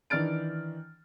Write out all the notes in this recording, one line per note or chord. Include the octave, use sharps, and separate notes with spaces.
D#3 E3 D4 F6 A6 D7